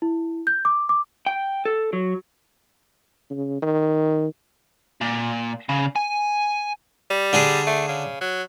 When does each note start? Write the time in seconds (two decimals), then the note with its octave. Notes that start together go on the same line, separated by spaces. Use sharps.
0.02 E4
0.47 G6
0.65 D6
0.89 D6
1.26 G5
1.65 A4
1.93 F#3
3.30 C#3
3.62 D#3
5.01 A#2
5.69 C#3
5.96 G#5
7.10 G3
7.33 D3 D4 G#4
7.67 A3
7.88 C#3
8.21 F#3